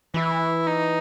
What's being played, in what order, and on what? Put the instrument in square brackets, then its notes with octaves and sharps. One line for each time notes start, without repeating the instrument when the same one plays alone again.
[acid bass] E3 [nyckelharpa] E4
[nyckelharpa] D#4